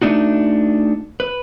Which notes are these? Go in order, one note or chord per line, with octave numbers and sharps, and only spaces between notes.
A3 D4 D#4 F#4
B4